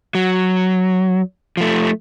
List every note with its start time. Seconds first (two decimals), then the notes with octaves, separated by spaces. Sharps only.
0.15 F#3
1.57 F3 A3